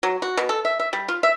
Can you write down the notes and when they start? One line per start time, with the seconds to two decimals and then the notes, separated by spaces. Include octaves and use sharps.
0.03 F#3
0.22 F#4
0.37 B2
0.49 A4
0.65 E5
0.80 E5
0.93 G3
1.08 F4
1.23 E5